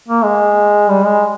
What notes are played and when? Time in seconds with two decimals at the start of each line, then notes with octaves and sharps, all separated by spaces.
0.08 A#3
0.24 G#3
0.90 G3
1.05 G#3